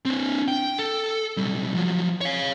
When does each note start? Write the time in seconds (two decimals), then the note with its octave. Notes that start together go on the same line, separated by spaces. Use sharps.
0.05 C4 D4
0.48 G5
0.79 A4
1.37 B1 G3
1.75 F3 F#3
2.21 C#5 F5